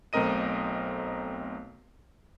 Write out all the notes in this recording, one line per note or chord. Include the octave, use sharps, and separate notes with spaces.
B1 A3 C4 A#4 D#5 D#7